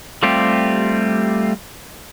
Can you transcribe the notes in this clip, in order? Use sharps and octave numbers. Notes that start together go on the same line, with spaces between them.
G3 A3 C4 F4 G4